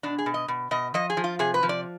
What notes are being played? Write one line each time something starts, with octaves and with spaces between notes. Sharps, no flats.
B2 D4
G#4
B2
D#5
B2
B2 D#5
F3 D#5
G#4
F3
F4
C3 G#4
B4
F3
D5